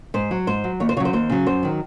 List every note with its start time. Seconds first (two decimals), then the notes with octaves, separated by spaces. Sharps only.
0.14 G#2 C5
0.31 F#3
0.47 G#2 C5
0.64 F#3
0.80 D#2 C#5
0.89 C5
0.97 C#3 C#5
1.00 F#3 C5
1.13 D#2 C5
1.30 C#3 F#3
1.46 F#2 C5
1.63 D#3 F#3